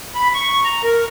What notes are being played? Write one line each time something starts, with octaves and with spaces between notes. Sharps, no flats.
B5
C#6
A#5
A#4